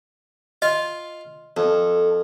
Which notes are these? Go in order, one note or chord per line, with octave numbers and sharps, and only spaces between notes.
F4 D#5 F5
F2 A4